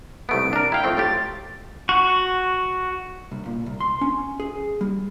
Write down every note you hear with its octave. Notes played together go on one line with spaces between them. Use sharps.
C2 A3 B3 D7
D4 A#4
E4 F5 G5
F3 A3 C4
A2 F4 G4 A6
F#4 C#6
C2
A#2
C2
C6
C#4
G#4
G3